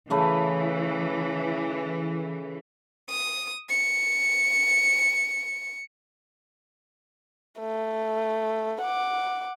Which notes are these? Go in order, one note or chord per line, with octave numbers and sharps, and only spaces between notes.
C#3 E3 A3 B4
D#6
C#7
A3
F#5 D6